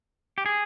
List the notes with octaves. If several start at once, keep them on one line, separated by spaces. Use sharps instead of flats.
G4
G#4